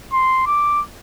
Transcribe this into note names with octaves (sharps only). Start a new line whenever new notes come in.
C6
D6